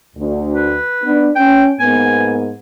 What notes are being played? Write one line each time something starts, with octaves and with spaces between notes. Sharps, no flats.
D2
B4
B3 D4
C#4 G5
G#2 A#3 B3 G#5